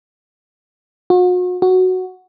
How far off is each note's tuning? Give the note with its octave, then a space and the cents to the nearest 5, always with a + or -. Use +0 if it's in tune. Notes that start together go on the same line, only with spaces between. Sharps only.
F#4 -40
F#4 +0